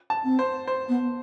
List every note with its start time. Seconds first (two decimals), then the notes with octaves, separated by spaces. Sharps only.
0.10 A5
0.25 C4
0.39 C5
0.67 C5
0.89 B3